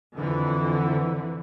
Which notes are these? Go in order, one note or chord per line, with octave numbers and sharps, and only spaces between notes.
F2 D3 E3